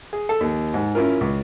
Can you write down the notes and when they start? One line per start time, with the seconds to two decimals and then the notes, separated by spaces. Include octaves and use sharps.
0.13 G#4
0.29 A4
0.41 D#2
0.74 G#2
0.95 C#4 E4 F4 A#4
1.21 C#2